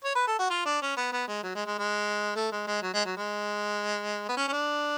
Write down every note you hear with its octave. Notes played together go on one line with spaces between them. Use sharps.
C#5
B4
A4
F#4
F4
D4
C#4
B3
B3
G#3
F#3
G#3
G#3
G#3
A3
G#3
G#3
F#3
G#3
F#3
G#3
B3
C#4
C#4
D4